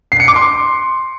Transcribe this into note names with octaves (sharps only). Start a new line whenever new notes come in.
C7
C#7
D6
C6